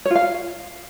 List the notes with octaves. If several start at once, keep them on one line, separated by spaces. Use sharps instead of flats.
C#5
F4
F5